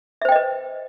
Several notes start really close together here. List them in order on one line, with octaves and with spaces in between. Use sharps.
E5 C5 G5 D#5 B4